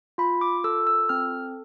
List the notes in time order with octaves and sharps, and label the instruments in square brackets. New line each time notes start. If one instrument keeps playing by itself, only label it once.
[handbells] F4 B5
D6
A4 E6
E6
C4 F6